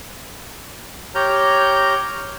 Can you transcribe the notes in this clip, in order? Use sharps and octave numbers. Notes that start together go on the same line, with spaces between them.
G4 C#5 A#5 F6 G6